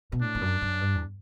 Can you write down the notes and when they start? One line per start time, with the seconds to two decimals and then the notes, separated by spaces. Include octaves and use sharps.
0.12 B2
0.22 A2 D4
0.35 E2
0.41 F#2
0.62 F#2
0.81 G2
0.95 E2